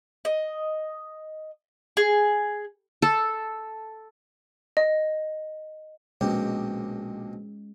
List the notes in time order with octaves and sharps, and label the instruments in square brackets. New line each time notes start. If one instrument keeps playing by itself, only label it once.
[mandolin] D#5
G#4
[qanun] A4
[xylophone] D#5
[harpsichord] A#1 B2 G4 [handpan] G#3 C#4